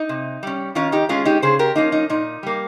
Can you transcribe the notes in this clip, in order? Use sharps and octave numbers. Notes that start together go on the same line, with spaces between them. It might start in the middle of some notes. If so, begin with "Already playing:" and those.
Already playing: D#4
C3
G3 C#4
D#3 C#4 F4
D#4 G4
G#3 C#4 F4 G#4
D#4 G4
C#3 G#4 C5
G4 A#4
F3 A#3 C#4 D#4
D#4
A#2 D#4
G3 A#3